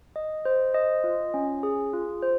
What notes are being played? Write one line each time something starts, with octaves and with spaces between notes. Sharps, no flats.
D#5
C5
D#5
F4
C#4
G#4
F4
C5